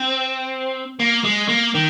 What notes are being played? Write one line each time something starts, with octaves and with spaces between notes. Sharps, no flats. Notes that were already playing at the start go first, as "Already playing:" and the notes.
Already playing: C4
A#3
G#3
A#3
D#3